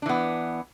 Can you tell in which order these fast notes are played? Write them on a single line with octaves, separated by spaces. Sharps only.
D4 E3 B3